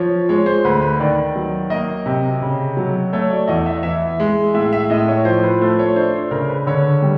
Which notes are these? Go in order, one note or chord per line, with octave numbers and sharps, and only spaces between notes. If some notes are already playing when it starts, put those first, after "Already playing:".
Already playing: F3 C#5
G#3 C#5
C5
D2 B4
B4
D#3 D5
F#3
A#3 D#5
C3
C#3
F#3
A3 C#5
D5
E2 D#5
E5
E3 E5
G#3
A2 E5
E5
A2 D#5
C#5
F3 C5
B4
A3 C5
C#5
D4 C5
C5
C#3 A#4
B4
D3 C#5
G3